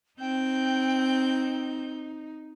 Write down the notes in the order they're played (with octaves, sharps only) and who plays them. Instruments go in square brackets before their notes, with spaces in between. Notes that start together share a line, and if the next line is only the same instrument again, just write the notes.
[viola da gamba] C4 [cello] D#4 [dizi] G5 [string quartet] G6